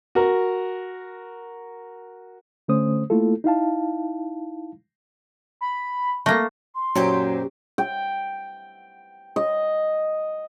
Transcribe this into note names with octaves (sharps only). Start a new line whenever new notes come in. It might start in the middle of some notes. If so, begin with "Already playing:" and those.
F#4 A#4
D3 A3 C#4 C5 D#6
A3 A#3 E4 F4 A4
D#4 E4 F5 A5
B5
A3 A#3 A#6
C6
F#2 A#2 F#3 G4 C5
G5
D#5